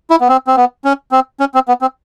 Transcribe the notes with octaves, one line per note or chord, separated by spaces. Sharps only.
E4
B3
C4
C4
B3
C#4
C4
C#4
C4
B3
C4